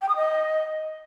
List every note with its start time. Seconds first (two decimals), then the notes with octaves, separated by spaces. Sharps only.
0.02 G5
0.09 D#6
0.16 D#5